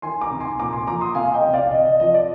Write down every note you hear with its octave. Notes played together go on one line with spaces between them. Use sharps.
D#3 G#5 C6
A#5 D6
C3
G#5 C6
A#2 A#5 D6
G#5 C6
F3 A#5 D6
C6 D#6
C3 F5 G#5
D#5 G5
C3
D5 F5
C3 D#5
D#5
F3 D#5
D5